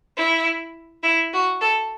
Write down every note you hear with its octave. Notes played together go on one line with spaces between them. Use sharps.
E4
E4
F#4
A4